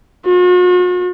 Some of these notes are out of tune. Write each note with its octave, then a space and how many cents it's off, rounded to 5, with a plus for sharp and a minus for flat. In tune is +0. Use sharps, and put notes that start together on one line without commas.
F#4 -45